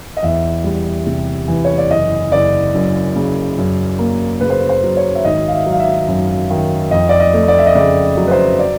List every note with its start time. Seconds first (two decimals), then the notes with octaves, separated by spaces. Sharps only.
0.17 D#5
0.23 E2 E5
0.64 G3
1.06 C3
1.48 E3
1.65 C#5
1.78 D5
1.90 F#1 D#5
2.32 F#1 D5
2.74 F#2
3.16 C#3
3.58 F#2
3.99 A#3
4.41 C#3 B4
4.50 C5
4.59 B4
4.69 C5
4.83 F#3
4.97 C#5
5.15 E5
5.25 G#1 D#5
5.48 F5
5.53 E5
5.66 F#3
5.72 F5
5.80 E5
6.08 F#2
6.50 D#3
6.91 F2 D#5
7.09 D5
7.20 D#5
7.33 A3
7.48 D5
7.58 E5
7.66 D#5
7.75 C#3 D5
8.17 F#3
8.27 B4
8.31 C5
8.59 D5